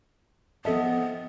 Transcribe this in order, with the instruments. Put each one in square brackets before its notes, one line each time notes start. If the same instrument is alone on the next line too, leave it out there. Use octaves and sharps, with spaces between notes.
[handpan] F3 C4 D#5 [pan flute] B3 [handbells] A4 E5 A5